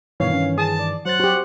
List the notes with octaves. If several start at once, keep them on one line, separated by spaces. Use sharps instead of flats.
G2 B2 D#3 E3 C#5 F5
C#4
G#4 A5 D#6
D5
F#3 C5 F#5 A6
F#4 G4 C5